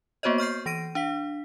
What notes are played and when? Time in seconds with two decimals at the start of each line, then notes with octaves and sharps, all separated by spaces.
0.23 A#3 B3 F#4 C5 C#5 D#5
0.38 C#6 F6 G6 C7
0.66 E3 A#6 D7 D#7
0.95 D4 F5 B6